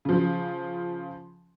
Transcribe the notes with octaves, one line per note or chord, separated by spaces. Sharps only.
C#3 F3